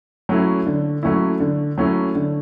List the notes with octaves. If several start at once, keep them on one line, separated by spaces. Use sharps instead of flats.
F#3 A3 C#4 E4
D3
F#3 A3 C#4 E4
D3
F#3 A3 C#4 E4
D3